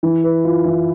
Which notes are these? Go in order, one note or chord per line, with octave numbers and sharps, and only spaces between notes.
E3
B4
F4
E3